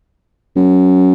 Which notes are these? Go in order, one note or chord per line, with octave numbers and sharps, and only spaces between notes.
F#2